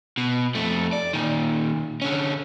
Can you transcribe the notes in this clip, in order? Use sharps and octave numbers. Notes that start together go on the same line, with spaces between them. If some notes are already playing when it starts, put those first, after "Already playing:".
B2
F2 A3
D5
A#2 D#3
D3 C#4